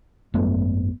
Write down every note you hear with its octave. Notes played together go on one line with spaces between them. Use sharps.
G#1 F#2 A3 B3